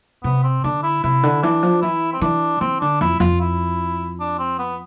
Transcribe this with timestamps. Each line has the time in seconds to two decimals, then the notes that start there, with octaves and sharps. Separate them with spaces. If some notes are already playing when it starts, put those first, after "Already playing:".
0.24 C3 B3
0.44 C4
0.64 D3 D4
0.83 E4
1.04 C3 E4
1.23 D3
1.43 E3 D4
1.63 F3
1.82 E3 E4
2.13 C4
2.21 E3 D4
2.61 E3 C4
2.81 D3 D4
3.01 F2 E4
3.20 F2 F4
3.41 E4
4.20 D4
4.39 C4
4.59 B3